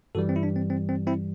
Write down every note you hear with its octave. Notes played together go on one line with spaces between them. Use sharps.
G2 E3 G3 F#4 A4
C4
E4
D4
C4
C4
C4
C4 E4